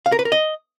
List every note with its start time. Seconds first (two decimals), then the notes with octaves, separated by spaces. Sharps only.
0.06 F5
0.12 A#4
0.19 B4
0.25 A#4
0.32 D#5